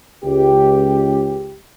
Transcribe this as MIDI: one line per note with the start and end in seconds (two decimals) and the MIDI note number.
0.24 1.56 37
0.24 1.56 67